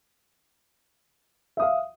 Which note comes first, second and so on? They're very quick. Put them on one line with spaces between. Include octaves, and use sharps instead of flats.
E5 D#6 F5